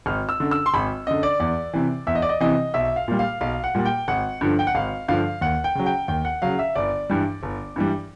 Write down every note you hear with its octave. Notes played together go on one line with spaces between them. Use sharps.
G#1 F6
E6
F#2 D3
E6
C6
G#1 B5
F#2 D3 D#5
D5
E2 D5
C3 E3
E2 E5
D#5
D5
D#5
C3 E3 D#5
B1 E5
F5
A#2 G3
F5
B1 F5
F#5
A#2 G3
G5
G#1 F#5
G2 D3 F3
G5
F#5
G#1 F5
G2 D3 F3 F5
D#2 F#5
G5
C#3 F#3
G5
D#2 G5
F#5
C#3 F#3 F5
E5
G1 D5
G2 E3 G3
G1
G2 E3 G3